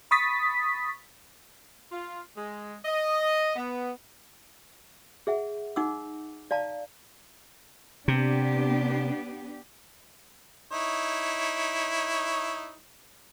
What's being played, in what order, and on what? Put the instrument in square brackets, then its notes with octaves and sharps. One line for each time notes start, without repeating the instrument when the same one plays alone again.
[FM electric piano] B5 C#6 D#6 A6 B6
[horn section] F4
G#3
D#5
B3
[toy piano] G#4 E5 F#5
D#4 F#5 D6 E6
D5 F5 A5 A#5
[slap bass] C3 [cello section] B3 D4 G4
[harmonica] D#4 E4 C#5